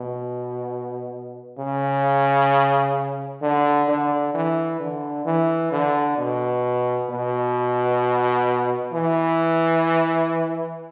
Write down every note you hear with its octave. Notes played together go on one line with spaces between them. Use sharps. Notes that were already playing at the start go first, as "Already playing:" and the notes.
Already playing: B2
C#3
D3
D3
E3
D3
E3
D3
B2
B2
E3